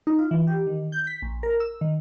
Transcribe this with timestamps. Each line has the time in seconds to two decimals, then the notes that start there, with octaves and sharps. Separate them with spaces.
0.07 D#4
0.19 F4
0.31 E3
0.47 G4
0.67 D#3
0.92 G6
1.07 B6
1.22 A#1
1.43 A#4
1.60 E6
1.81 D#3